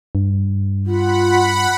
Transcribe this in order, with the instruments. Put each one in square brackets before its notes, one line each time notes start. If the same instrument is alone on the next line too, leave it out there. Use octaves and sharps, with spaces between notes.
[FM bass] G2
[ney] F4 [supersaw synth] F#5 B5